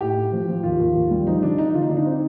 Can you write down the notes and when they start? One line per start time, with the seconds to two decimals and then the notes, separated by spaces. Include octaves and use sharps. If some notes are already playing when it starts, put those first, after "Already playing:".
0.01 A2 G4
0.17 A2
0.32 F3
0.48 F3
0.63 D#2 F4
0.80 D#2
0.96 D#2
1.11 G3
1.27 F3 D#4
1.43 D3 D4
1.58 D3 D#4
1.74 D3 F4
1.82 D#4
1.89 D3 D4
1.97 D#4
2.06 C4